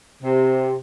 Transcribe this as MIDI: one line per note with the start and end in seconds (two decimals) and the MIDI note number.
0.23 0.75 48